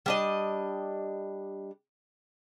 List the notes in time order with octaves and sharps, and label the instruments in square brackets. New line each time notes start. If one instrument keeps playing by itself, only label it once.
[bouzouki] G3 D4 D#5